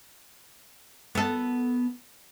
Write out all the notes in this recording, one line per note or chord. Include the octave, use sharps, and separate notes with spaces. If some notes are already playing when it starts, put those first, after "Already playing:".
B3 A4